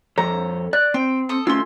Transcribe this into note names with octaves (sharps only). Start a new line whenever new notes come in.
F2 A4 C#5 A#5
D5 F#6
C4 G5
A4 D#6
A3 C#4 F4 C6 E6